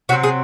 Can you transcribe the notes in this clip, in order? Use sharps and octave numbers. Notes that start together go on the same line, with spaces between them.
C3 F#3 C4 F#4
G#4